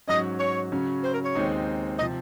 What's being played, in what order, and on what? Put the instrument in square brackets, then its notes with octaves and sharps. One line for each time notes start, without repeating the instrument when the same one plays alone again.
[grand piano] G#2 F#3 C#4 [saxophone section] D#5
[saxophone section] C#5
[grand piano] C#3 F#3 C#4
[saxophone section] C5
A#4
C#5
[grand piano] D#2 D#3 G#3 C4 D#4
[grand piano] C3 F3 [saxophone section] D#5